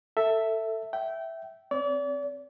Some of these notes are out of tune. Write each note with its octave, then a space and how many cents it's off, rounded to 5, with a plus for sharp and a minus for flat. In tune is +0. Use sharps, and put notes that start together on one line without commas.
A4 +20 E5 +0
E5 +0 G5 -25
C4 +0 D5 -40